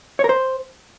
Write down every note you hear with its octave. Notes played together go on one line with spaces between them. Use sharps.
C#5
A#4
C5